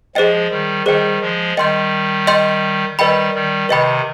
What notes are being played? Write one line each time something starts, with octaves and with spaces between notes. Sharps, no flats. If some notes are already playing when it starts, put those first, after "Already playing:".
F3 G#3 G#4 C5 D#5 G5
D#3 G3
D#3 G3 G#4 C5 D#5 G5
F3 G#3
D#3 G3 D#5 G5 C6 G6
D#5 G5 C6 G6
D#3 G3 B4 D#5 G5 B5
D#3 G3
C3 D#3 B4 D#5 G5 B5